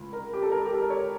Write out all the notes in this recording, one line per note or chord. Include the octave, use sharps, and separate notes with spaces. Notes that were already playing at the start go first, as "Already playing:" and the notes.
Already playing: C#2
A#4
G4
A4
A#4
G4
A4
A#4
C#5